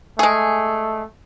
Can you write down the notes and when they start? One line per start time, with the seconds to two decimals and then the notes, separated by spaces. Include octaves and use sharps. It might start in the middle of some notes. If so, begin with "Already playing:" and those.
0.19 G#3 A3 G#4